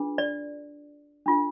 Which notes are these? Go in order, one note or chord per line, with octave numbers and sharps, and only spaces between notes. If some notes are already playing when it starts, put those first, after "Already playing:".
Already playing: D4 F4 G#4 B4
D5
D4 F4 A4